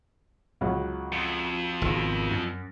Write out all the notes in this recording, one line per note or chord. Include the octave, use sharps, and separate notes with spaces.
C#2 F#3
F2
G#1 B2
F#2